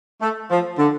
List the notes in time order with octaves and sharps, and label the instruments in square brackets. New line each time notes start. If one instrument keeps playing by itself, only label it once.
[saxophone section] A3
F3
D3